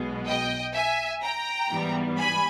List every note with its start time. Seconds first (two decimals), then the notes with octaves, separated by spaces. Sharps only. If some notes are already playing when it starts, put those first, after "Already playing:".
Already playing: B1 B2 G#3 B3
0.27 D#5 G5
0.75 E5 G#5
1.23 G5 A#5
1.71 G#2 E3 G3 B3
2.19 G#5 B5